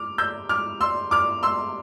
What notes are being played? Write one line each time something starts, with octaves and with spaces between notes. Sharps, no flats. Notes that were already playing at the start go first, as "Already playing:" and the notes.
Already playing: D6 F6
E6 G6
D6 F6
C6 E6
D6 F6
C6 E6